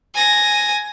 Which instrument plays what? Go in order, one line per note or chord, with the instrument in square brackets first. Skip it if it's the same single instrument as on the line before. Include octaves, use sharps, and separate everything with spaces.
[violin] G#5 A#6